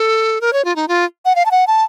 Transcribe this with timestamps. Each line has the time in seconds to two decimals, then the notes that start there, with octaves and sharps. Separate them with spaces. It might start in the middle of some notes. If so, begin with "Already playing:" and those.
Already playing: A4
0.41 A#4
0.53 C#5
0.65 F4
0.76 D#4
0.88 F4
1.25 F#5
1.36 F5
1.46 A5
1.51 F#5
1.67 A5